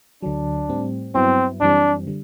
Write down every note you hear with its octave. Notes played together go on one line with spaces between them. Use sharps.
D2 D3 F#3 D4
A2 G3 C4
G2 F#3 B3 C4 E4
F#2 E3 G3 C4 D4
D3 G3